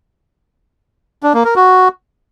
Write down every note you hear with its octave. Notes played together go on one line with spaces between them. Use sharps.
D4
A#3
A#4
F#4